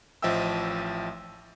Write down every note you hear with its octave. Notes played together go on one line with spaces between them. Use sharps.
A1 F3 D#5 E5 G5 E6